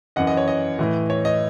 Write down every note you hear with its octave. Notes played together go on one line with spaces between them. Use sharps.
F#2 E3 D#5 F#5
D#5
C#5
D#5
A2 E3
C#5
D#5